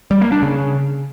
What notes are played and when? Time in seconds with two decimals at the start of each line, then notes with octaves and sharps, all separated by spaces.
0.11 G3
0.21 A#3
0.32 D4
0.42 C#3